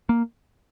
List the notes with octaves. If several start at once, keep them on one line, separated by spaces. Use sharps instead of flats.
A#3